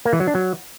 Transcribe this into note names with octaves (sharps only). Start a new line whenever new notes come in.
A#3
E3
F#3
D4
F#3